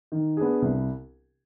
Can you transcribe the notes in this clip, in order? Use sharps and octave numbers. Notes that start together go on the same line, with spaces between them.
D#3
B3 D4 G#4
C2